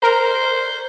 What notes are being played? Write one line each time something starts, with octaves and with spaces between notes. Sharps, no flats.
A#4 C5